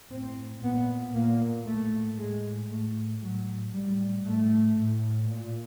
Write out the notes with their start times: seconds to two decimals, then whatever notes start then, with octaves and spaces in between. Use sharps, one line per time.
0.12 A2 C4
0.63 A#2 B3
1.14 A#2 A#3
1.66 A2 A3
2.18 A2 G#3
2.70 A2 A3
3.23 A2 F#3
3.74 A2 G3
4.26 A2 A3
4.78 A2
5.29 A#2